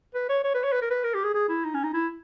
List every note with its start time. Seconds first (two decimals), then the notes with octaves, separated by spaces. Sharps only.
0.14 B4
0.29 C#5
0.44 C#5
0.54 B4
0.64 C#5
0.72 B4
0.82 A#4
0.90 B4
1.04 A#4
1.14 G4
1.24 G#4
1.34 G#4
1.49 E4
1.64 D#4
1.74 C#4
1.84 D#4
1.94 E4